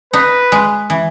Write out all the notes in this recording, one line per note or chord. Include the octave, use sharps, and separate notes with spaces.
D#4 B4
G#3
E3